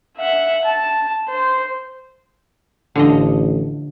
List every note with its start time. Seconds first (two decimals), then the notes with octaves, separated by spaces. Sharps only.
0.17 E5 F#5
0.65 A5
1.29 C5
2.95 A1 D3 F3 D#5